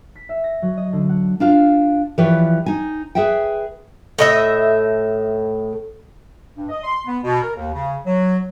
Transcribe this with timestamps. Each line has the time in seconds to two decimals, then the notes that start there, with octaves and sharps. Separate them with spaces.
0.15 B6
0.29 E5
0.44 A#6
0.62 F#3
0.77 D#5
0.93 D3
1.09 F#5
1.40 D4 F4 F5
2.18 E3 F3 G4 B4 C#5 D5
2.66 D#4 G#5
3.15 G#4 B4 E5 F#5 G5
4.19 A2 D#5 E5
6.56 G2
6.69 D#5
6.84 C6
7.06 B3
7.23 B2
7.42 A#4
7.56 D#2
7.74 C#3
8.06 F#3